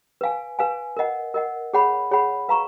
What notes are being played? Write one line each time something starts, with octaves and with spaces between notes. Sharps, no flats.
B4 F5 G#5
B4 F5 G#5
A#4 D#5 F#5
A#4 D#5 F#5
G#4 C#5 F#5 B5
G#4 C#5 F#5 B5
B4 F5 A#5 C#6